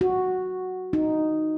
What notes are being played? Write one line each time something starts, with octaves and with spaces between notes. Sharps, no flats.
F#4
D#4